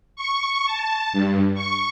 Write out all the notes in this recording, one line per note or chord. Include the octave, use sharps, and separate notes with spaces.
C#6
A5
G2
C#6